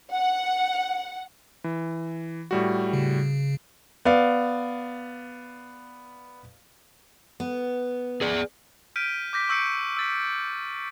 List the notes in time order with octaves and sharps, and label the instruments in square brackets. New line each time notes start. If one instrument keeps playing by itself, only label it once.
[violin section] F#5
[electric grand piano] E3
A2 G3 F#4
[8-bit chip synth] C#3
[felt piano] B3 D5 F5
[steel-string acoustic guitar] B3
[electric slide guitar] G#4 D5
[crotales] F6 G6 B6 D7 D#7
D6 G6 A#6 B6
C#6 E6 G6 A#6 C#7 D7
E6 A6 B6